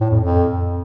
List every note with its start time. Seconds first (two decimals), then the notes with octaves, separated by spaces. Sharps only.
0.01 A2
0.11 F2
0.21 F2